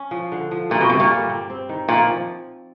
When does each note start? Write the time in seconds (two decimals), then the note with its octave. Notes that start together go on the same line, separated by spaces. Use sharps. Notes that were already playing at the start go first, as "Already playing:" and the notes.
Already playing: C#4
0.11 F3
0.32 D3
0.51 F3
0.70 G2 A#2
0.81 B2
0.90 G2 C3
1.00 A#2
1.10 G3
1.29 C4
1.50 C4
1.69 D#3
1.88 A#2 F3
2.08 F3